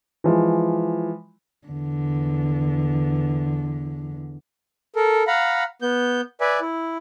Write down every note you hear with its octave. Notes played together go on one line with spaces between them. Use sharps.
E3 F3 G#3
E2 D3
A4 A#4
F5 F#5 A#5 B5
B3 G6
B4 D5 E5 G#5
E4